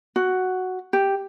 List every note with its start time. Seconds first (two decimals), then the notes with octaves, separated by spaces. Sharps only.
0.16 F#4
0.93 G4